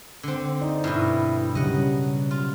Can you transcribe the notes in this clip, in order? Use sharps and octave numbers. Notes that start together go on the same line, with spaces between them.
D3 C4
D#4 D5
G2 B2 E4
C#3 F#3 G3 D#5 F#5
F4